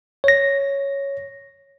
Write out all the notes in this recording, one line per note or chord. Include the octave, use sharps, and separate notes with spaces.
C#5 A#6